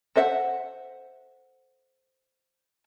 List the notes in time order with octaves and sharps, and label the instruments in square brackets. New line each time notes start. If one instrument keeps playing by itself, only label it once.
[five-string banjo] A4 C5 E5 F#5